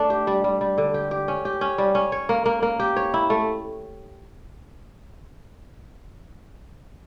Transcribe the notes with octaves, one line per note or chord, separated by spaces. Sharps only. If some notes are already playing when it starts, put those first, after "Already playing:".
Already playing: A3 D4
G4
G3
G3
G3
D3
G4
G4
C#4
G4
C#4
G3
C#4
C#5
A#3
A#3
A#3
G4
C#5
E4
A3